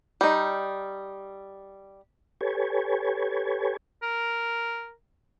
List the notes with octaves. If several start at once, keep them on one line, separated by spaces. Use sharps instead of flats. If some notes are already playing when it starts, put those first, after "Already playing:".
G3 D#4
G4 A4 B4 C#5 G#5
A#4